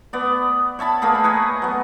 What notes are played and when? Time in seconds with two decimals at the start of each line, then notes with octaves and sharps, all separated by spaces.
0.13 B3 D5
0.79 C#5 E5 A5 B5
1.02 A3 A#3 G#4 B5
1.24 B4 C#5 D#5
1.62 F#3 B3